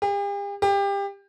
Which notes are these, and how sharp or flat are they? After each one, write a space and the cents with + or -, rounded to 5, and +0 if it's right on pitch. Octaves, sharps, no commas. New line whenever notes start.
G4 +45
G4 +25